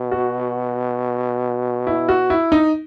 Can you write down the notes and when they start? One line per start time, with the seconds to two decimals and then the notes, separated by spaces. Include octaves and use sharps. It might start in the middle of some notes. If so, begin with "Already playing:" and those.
Already playing: B2
0.12 F#4
1.87 E4
2.09 F#4
2.30 E4
2.52 D#4